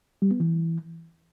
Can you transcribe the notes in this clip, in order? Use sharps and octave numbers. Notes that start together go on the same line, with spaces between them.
G3
B3
E3